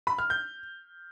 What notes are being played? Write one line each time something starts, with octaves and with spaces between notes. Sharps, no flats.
B5
F6
G6